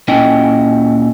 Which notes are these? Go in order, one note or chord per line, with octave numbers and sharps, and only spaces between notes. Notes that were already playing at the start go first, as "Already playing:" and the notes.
A#2 C#4 E4 D#5 G5